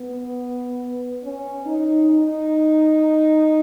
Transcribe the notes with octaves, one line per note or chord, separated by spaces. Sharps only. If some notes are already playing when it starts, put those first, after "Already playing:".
Already playing: B3
C#4
D#4
D#4